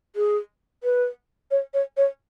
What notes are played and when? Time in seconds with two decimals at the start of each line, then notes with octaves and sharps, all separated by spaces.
0.16 G#4
0.84 B4
1.51 C#5
1.74 C#5
1.97 C#5